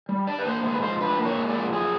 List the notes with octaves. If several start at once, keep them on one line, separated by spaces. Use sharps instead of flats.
G3
D4 D5
B4
A#3 C5
G#2 C5
B4
F3 C5
D4 B4
A#3
C#5
G#2
D5
F3
F#2 G#4